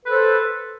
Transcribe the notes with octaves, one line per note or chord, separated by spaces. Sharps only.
A4 B4 C5